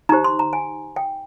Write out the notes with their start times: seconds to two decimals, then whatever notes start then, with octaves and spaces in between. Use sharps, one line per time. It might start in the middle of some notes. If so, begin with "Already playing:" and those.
0.09 D#4 G4 C5 A#5
0.24 C6
0.39 A#5
0.53 G#5
0.96 G5